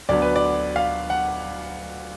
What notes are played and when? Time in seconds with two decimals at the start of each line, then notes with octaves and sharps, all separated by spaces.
0.09 D2 D3 F#3 B3 D5
0.22 B4
0.36 D5
0.76 F5
1.10 F#5